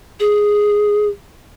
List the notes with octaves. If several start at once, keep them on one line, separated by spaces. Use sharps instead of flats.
G#4